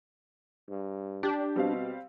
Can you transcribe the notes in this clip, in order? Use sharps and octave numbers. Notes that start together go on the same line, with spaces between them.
G2
D4 G4
B2 G3 C4 F5